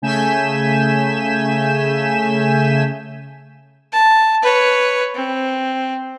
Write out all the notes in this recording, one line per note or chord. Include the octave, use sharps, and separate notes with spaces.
C#3 A3 G#5 G6 B6 E7
A5
B4 C#5
C4